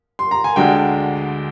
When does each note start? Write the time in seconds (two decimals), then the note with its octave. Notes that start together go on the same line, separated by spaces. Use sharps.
0.19 C6
0.31 A#5
0.44 G#5
0.56 D2 D3 G#3 D4 G5